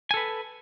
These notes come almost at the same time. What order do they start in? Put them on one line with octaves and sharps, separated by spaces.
G#5 A4 B4